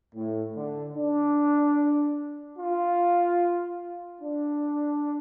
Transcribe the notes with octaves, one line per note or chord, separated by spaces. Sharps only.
A2
D3
D4
F4
D4